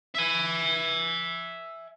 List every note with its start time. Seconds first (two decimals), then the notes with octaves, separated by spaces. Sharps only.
0.15 E5 G#5